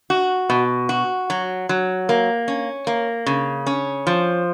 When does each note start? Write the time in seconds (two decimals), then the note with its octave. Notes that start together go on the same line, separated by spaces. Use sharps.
0.10 F#4
0.50 B2
0.89 F#4
1.30 F#3
1.69 F#3
2.09 A#3
2.48 C#4
2.87 A#3
3.26 C#3
3.67 C#4
4.07 F3